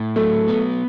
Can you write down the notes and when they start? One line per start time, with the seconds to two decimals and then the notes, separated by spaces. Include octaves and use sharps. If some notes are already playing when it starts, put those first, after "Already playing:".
Already playing: A2
0.16 F#3 A3
0.48 B3